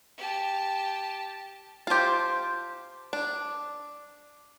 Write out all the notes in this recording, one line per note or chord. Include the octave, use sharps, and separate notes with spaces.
G4 A5
F4 G4 C5 A5
D4